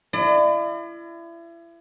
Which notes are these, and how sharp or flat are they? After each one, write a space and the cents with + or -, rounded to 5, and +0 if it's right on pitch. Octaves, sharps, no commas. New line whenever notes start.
E4 +35 D5 +40